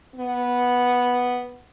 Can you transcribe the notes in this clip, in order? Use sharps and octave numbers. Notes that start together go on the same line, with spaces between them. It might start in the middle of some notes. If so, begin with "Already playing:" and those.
B3